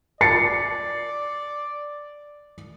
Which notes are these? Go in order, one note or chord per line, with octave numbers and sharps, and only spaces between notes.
D5 A6 C7 C#7